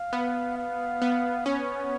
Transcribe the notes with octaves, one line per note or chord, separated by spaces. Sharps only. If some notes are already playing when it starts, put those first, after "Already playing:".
Already playing: F5
B3
F5
B3
C#4 C#5